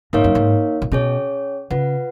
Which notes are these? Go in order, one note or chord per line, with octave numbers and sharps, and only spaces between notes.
G#2 A#3 D#4 A#4 C#5 F5
F#2
G#2
A#2
B2 C#4 G#4 C#5
C#3 F4 B4 F#5